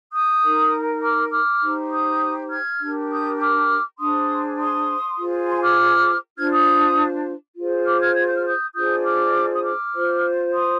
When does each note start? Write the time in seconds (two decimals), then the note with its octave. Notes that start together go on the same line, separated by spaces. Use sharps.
0.13 D#6 G6
0.42 D#4 A#4
1.02 D6 F6
1.31 D6 F6
1.61 D#4 G4 C5
1.91 D#6 G6
2.50 F6 G#6
2.80 D4 G4 A#4
3.10 D#6 G6
3.39 D6 F6
3.99 D4 G#4 C5 C6 D#6
4.59 C6 D#6
5.18 F4 G#4 C5
5.48 G#5 C6
5.62 D6 F6
6.37 D4 F4 C5 F6 G#6
6.51 D#6 G6
7.56 F4 G#4 C5
7.85 D6 F6
8.00 F6 G#6
8.15 G#6
8.26 G6
8.36 F6
8.46 D#6 G6
8.74 D4 F4 G#4 C5 D#6 G6
9.04 D6 F6
9.55 D#6
9.63 D6 F6
9.93 F4 C5
10.53 C6 D#6